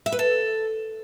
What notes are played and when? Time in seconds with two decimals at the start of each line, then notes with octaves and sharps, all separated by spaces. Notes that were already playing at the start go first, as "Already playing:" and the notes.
0.06 E5
0.12 B4
0.19 A4